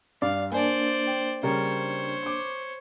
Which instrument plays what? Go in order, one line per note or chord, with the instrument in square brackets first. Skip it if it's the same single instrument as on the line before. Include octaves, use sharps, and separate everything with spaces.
[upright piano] G2 [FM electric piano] D5 [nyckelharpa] F5
[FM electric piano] A#3 D4 [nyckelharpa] C5 D5 [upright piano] G#5
[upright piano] G5
[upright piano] C#3 G3 A#4 [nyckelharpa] C5 C#5
[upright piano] C#6 D6